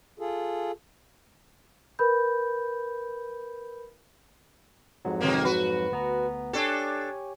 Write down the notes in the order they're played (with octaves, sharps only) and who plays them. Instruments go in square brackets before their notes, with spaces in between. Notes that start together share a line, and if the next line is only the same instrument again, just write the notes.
[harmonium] F4 G#4 A4
[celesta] A#4 B4 B5 G6
[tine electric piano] F2 G#2 F#3
[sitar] C3 D#3 A#3
F#4 B4
[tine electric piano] D2 B3 A#5
[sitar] D4 A4 [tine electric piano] G4 C#5 G#5